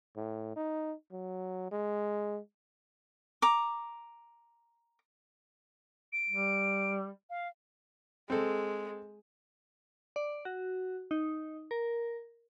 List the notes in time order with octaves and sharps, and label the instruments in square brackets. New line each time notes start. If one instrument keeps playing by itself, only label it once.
[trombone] A2
D#4
F#3
G#3
[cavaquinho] A#5 D6
[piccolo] D7
[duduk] G3
[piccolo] F5
[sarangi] G#3 [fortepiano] C4 A4
[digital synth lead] D5
F#4
D#4
A#4